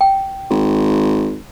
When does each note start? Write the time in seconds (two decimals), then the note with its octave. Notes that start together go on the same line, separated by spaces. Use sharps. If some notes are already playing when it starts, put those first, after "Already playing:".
0.01 G5
0.50 G#1